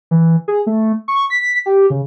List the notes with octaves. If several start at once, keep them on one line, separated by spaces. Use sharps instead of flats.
E3
G#4
A3
C#6
B6
G4
C#3